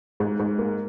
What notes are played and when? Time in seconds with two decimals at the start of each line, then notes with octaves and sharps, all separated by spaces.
0.20 G#2
0.39 G#2
0.58 A#3